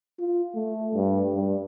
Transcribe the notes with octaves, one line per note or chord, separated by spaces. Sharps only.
F4
A3
G2
G2